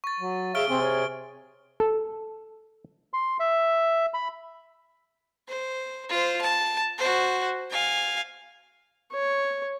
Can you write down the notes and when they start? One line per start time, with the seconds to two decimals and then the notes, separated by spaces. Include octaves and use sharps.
0.04 C#6 A6
0.20 F#3
0.55 G#4 C#5 E5 F5 F6 D7 G7
0.68 C3 C4 G#4
0.81 C#5
1.80 A4
3.14 C6
3.40 E5
4.14 B5
5.48 C5
6.10 F4 C5
6.41 A5
6.98 F#4 C5
7.71 F5 G#5
9.12 C#5